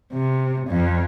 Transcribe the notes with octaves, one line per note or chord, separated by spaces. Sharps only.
C3
F2